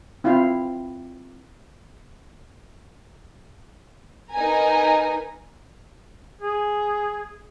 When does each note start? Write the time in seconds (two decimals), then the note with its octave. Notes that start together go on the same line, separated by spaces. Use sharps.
0.24 C4 E4 F4 F5 G5
4.33 D#4 A#4 B4 G#5 A#5
6.41 G#4